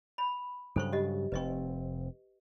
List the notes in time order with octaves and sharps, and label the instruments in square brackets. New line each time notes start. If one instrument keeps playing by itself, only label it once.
[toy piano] B5
[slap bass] G2 C#3 F#3 [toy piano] A4 C5 C#6
[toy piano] G4 D#5
[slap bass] F1 C4 [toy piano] B4 D#5 C#6